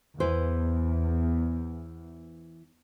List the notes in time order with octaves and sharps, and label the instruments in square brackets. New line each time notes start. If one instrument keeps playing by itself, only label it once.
[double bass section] E2 [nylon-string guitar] E3 B4 C5